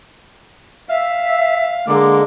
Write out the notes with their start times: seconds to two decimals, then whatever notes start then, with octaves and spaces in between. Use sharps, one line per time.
0.89 E5 F5
1.88 D3 G#3 A#3 D6